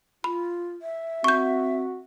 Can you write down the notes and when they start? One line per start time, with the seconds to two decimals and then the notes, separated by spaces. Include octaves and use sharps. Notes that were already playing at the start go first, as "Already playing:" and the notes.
0.24 F4 B5
0.82 E5
1.24 C4 F#4 C#6 G6